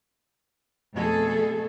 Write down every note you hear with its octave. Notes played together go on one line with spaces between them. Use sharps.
F2 B2 A3 G#4 A4